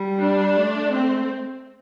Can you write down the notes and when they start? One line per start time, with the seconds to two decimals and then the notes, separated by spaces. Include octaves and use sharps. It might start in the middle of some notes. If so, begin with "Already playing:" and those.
Already playing: G3
0.20 D4
0.57 A3
0.94 C4